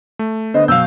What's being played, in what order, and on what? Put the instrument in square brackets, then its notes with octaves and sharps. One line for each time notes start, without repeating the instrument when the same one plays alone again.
[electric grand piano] A3
[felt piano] D3 B3 [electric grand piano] C5 [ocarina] D#5
[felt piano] B2 F#3 [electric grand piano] F5 G6 [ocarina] E6